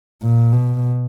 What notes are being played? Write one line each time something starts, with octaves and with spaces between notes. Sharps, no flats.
A#2
B2